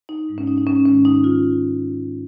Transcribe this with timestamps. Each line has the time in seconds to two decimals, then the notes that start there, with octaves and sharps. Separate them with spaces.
0.09 D#4
0.29 G#2 G#3
0.38 C#4
0.48 D#4
0.58 D#4
0.67 C#4
0.85 G#2 D#3 G#3 C#4
1.05 D#4
1.24 F4